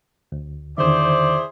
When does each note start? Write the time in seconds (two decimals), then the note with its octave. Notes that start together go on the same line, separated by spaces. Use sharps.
0.32 D2
0.78 E2 D3 D#3 E4 G#4 C5 D5